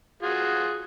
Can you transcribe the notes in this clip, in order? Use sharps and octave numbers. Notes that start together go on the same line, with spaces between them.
F4 F#4 G#4